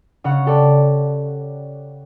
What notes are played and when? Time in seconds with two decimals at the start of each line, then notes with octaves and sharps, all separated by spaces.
0.24 C#3 C#5 F#5 C#6
0.46 G4 A4 C#5 D5